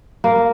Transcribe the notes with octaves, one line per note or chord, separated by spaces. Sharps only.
A#3